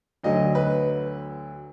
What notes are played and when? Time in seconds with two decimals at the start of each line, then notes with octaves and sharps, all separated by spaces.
0.23 D2 D3 F#3 D#5
0.55 B4